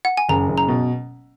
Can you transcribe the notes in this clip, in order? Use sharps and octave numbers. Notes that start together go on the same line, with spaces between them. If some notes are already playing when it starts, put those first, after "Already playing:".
F#5
G#5
F#1 A#5
F#1
A#5
B2